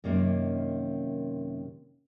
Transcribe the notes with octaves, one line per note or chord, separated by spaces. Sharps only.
F#2 C3 D#3 A#3 C#4 D#4